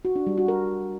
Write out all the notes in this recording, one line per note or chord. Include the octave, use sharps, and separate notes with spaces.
F#4
D4
G3
F#4
A#4